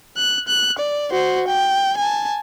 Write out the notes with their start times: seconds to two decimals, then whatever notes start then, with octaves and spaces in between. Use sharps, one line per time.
0.17 F#6
0.48 F#6
0.79 D5
1.11 F#4 C5
1.48 G5
1.98 G#5 A5